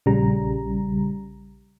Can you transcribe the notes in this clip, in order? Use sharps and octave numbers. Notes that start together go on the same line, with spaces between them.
A#1 C#3 G3 A#5